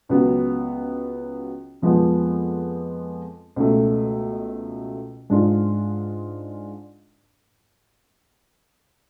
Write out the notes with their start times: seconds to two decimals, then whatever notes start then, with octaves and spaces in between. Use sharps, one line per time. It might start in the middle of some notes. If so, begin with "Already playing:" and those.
0.09 C#2 C#3 F#3 B3
1.82 F2 F3 G#3 B3
3.56 C#2 B2 A3
5.30 G#2 G#3 D4 F4